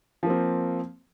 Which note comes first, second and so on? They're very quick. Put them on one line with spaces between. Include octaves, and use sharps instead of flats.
F3 A#3 C4